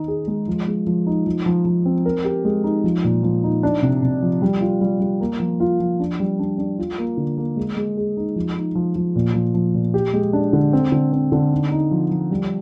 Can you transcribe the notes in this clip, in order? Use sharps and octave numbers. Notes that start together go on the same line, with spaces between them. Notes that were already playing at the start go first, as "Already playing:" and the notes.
Already playing: D#3 D#4
G#4
G#3
F3
G#3
F3
D#4
F3
F3
F3
C4
A#4
G4
G#3
D#4
F3
A#2
F3
D#4
D4
C3
C3
F3
G3
F4
G3
G3
A#3
F3
F4
F3
D4
G3
D4
D4
F4
A#3
D3
A#3
G#3
G#3
G#4
D#4
F3
D#4
F3
F3
A#2
F3
F3
A#2
G4
G#3
D4
D3
C4
D3
C4
D3
D#4
D#4
F3
F3
G3